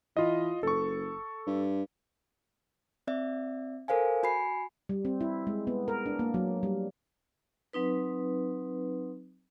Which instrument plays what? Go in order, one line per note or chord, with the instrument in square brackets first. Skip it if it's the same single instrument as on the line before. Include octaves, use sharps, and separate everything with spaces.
[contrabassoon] E3 [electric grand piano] F4 D#5
[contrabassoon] F#1 [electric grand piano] A4 C#6
[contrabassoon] G2
[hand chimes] C4 D5 E5
A4 A#4 C5 F5 G#5
F#4 G#5 B5 C7
[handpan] G3
C4
E4
G#3
B3
A#4
D4
A#3
F#3
G3
[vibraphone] F#3 C4 D#4 B4